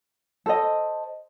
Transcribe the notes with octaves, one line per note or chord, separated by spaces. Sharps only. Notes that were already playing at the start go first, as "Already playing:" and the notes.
A4 C5 D#5